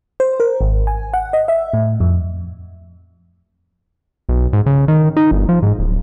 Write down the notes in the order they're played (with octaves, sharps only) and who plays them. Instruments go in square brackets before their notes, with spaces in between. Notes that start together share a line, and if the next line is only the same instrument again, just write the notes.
[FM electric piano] C5
A#4
G#1
G#5
F#5
D#5
E5
A2
F2
[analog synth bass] B1
G#2
C#3
D#3
D#4
G1
F3
G#2
D1